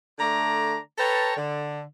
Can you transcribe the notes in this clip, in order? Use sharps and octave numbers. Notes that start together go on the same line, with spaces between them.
D3 A3 D5 A#5
A4 B4 C#5 G5 A5 A#5
D3